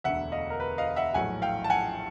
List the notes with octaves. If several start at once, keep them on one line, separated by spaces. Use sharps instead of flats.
E1 D2 D3 E5 F#5
D#5 F5
A#4
B4
D#5 F5
E5 F#5
A#1 A2 F#3 F#5 G#5
F5 G5
A5
F#5 G#5